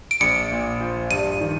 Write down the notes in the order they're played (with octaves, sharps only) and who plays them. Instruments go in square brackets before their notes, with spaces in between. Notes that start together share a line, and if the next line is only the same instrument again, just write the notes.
[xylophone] D7
[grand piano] A#1 [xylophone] C#7
[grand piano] A#2
F3
[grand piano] G2 [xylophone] D#7
[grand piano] D#3